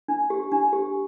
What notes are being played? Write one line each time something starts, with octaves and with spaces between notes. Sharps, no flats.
D4
G4
D4
G4